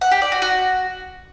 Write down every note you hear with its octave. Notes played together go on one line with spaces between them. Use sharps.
F#5
G4
D5
F#4
F#4